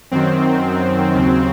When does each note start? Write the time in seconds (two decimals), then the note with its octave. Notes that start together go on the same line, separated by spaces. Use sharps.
0.11 F#2 D#3 F#3 C4
1.15 D#2 C#3 F#3